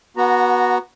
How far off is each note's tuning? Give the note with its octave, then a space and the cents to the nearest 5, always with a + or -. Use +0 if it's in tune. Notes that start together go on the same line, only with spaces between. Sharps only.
B3 -25 F#4 +0 A#5 -10